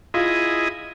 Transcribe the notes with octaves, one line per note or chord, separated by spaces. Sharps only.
E4 F4 G#4 D#5